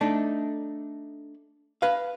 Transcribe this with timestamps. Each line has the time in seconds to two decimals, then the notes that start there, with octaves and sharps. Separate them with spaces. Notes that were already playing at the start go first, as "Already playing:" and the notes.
0.01 A3 D4 D#4
1.82 B4 F5